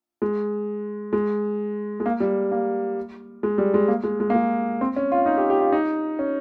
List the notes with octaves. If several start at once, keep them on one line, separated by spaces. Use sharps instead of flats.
G#3
G#3
G#3
A#3
G3
A#3
G#3
G3
G#3
A#3
G#3
G#3
A#3
G#3
C4
C#4
F4
D#4
G4
G4
F4
D#4
C#4